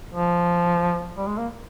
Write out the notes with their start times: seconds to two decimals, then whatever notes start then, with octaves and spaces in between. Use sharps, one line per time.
0.14 F3
1.17 G3
1.27 G#3
1.38 A#3